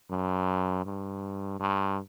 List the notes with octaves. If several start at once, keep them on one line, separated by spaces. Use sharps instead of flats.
F#2
G2
G2